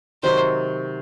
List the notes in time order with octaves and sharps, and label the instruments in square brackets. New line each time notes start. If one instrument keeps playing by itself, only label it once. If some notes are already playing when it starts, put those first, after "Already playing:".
[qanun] C3 D#3 F#3 [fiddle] C5